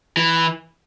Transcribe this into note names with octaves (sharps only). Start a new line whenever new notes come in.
E3